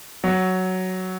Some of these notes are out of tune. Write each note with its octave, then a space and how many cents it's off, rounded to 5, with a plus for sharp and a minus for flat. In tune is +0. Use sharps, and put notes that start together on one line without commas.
F#3 +5